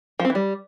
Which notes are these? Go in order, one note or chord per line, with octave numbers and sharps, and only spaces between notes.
F3
C4
E3
G3